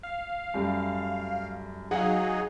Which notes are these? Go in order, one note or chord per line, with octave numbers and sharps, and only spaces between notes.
F5
F#2 G3 A3
F#3 D#4 G#4 F5 F#5